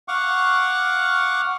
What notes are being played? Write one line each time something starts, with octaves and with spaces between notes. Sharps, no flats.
F5 F#5 C#6 D6